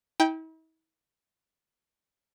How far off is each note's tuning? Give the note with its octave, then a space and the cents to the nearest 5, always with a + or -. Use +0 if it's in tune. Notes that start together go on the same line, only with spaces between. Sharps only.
E4 -45 G5 +0